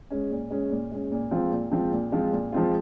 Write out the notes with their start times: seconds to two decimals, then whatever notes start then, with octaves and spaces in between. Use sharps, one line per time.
0.10 G#3 C#4
0.31 A#2
0.50 G#3 C#4
0.71 A#2
0.91 G#3 C#4
1.12 A#2
1.31 F3 G#3 C4 F4
1.52 A#2
1.71 F3 G#3 C4 F4
1.92 A#2
2.12 F3 G#3 C4 F4
2.32 A#2
2.52 F3 G#3 C4 F4